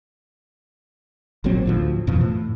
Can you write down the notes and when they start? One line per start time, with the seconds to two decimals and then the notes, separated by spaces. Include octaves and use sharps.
1.44 G#1 A#2 F#3 C4
1.66 D2 A2 F3
2.07 F2 B2 E3 F3
2.21 A2